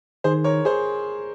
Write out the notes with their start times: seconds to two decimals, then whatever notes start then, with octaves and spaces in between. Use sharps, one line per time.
0.24 D#3 G#4 C5
0.44 A#4 C#5
0.65 G#4 C5